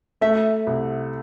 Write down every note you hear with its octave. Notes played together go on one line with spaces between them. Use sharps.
A3 E5
C2